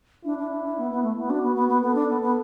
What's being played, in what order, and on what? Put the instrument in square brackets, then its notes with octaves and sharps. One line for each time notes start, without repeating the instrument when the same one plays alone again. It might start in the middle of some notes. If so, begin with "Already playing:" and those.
[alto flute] D4 [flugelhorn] E4
[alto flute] D4
D4
D4
B3
B3
A3
B3
[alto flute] D4 [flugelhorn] F#4
[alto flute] B3
B3
B3
[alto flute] B3 [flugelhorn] A4
[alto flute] D4
B3
B3